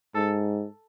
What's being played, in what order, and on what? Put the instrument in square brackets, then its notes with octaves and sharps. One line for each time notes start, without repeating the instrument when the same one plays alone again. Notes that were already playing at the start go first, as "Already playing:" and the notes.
[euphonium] G#2 [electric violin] A4